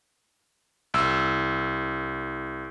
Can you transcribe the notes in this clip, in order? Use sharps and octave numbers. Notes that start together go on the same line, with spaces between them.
C2 E6